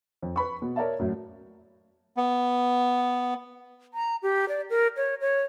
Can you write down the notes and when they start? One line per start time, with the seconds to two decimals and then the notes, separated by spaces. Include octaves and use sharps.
0.22 F2
0.36 B4 B5 C#6
0.62 B2
0.76 A#4 C#5 D5 E5 A5
0.99 F#2 A2 F#3
2.17 B3
3.94 A#5
4.23 G4
4.49 D5
4.70 A#4
4.97 C#5
5.21 C#5